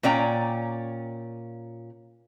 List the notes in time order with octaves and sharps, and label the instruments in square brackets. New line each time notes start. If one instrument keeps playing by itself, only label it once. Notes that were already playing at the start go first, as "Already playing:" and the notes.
[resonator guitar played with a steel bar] A#2 C#4 D5 G5 A#5